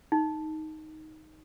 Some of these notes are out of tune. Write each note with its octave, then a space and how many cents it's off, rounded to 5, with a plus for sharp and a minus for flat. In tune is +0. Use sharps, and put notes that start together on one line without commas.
D#4 +5